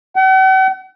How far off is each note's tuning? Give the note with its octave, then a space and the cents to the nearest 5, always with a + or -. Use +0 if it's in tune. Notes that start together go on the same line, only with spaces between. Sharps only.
F#5 +45